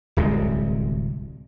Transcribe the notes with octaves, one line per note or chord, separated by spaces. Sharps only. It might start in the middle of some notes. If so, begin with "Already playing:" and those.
D1 C2 C3 G#3